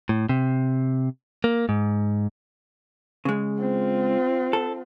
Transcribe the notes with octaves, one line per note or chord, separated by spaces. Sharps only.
A2
C3
A#3
G#2
C#3 G#3
C4 F4
A4